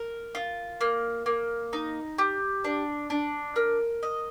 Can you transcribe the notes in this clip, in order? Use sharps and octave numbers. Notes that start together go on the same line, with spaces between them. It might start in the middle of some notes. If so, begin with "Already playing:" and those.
Already playing: A#4
F4
A#3
A#3
D#4
G4
D4
D4
A#4
D#5